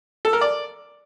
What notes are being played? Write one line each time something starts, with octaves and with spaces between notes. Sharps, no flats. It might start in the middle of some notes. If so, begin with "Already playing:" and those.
A4
A#4
D5